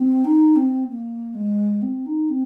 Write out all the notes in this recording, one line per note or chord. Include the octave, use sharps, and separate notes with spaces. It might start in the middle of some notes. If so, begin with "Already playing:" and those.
Already playing: C4
D#4
C4
A#3
G#3
C4
D#4
C4